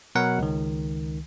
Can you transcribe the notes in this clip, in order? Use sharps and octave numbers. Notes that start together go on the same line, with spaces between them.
B2 F#3 A#4 F#5
C#2 D#3